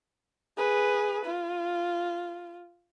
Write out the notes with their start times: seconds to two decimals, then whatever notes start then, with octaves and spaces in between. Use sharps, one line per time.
0.57 G#4 B4
1.25 F4